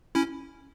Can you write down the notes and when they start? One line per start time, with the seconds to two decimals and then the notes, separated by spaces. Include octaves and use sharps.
0.15 C#4 E4